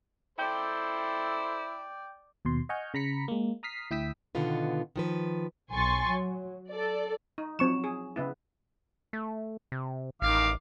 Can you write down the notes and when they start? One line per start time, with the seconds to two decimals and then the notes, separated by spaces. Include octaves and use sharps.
0.39 E4 A4 C5 D5 G5 G6
2.45 D#2 B2 C6
2.69 D#5 F#5 G#5 C#6 F6 G6
2.94 C#3 A#5 B5 B6 C#7
3.28 G#3 A#3
3.63 A#5 D#6 F6 B6 C7
3.91 D2 E4 G5 D#6 E6 B6
4.35 B2 D3 D#3 B3 F4 B4
4.96 D#3 F3 B4
5.71 B1 G#5 C6 C#6 A6
6.07 F#3
6.70 A4 D5
7.38 D#4
7.59 F3 F#3 C4 C#6 E7
7.84 G#4
8.16 C#3 B3 E4
9.13 A3
9.72 C3
10.22 A1 D#3 F5 D6